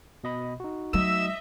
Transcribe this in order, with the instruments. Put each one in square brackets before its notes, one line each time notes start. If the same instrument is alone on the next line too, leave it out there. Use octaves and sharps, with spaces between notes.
[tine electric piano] B2 D#5 B5
D#4 F#4
[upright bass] F#3 A3 [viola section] D#5 E5 [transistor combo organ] E6